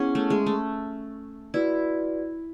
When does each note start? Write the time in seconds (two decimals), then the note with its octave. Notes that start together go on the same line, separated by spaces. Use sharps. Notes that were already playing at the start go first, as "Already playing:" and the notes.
Already playing: B3 C#4 E4 G#4 C#5 F#5
0.15 A3
0.30 G#3
0.46 A3
1.54 E4 F#4 B4 D5